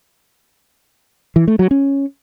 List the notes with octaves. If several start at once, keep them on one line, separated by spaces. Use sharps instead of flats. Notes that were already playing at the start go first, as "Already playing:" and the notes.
E3
A3
F#3
C#4